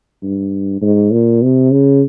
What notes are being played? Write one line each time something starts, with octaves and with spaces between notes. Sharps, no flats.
G2
G#2
A#2
C3
C#3